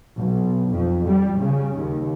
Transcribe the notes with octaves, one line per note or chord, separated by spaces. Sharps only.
B1
F2
G3
C#3
D#2